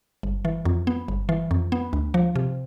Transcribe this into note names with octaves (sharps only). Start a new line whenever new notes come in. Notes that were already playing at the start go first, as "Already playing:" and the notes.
G1
E3
F2
B3
G1
E3
F2
B3
D2
F3
C3